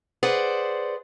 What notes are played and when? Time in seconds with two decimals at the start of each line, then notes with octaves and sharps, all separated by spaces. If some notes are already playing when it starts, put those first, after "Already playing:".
0.23 G#4 B4 C5 D5 F#5